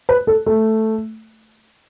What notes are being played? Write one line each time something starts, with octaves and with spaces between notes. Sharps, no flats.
B4
A4
A3